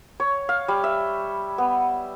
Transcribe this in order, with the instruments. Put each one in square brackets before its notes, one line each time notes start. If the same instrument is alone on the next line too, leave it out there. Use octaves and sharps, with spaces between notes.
[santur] C#5
F5
G3
E5
B3